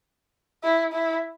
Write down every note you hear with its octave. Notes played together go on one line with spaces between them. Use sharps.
E4
E4